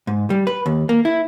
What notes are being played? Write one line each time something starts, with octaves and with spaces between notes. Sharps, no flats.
G#2
G3
B4
D#2
A#3
E4